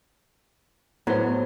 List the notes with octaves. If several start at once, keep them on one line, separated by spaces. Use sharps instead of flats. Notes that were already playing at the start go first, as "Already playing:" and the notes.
A2 F#3 B3 C5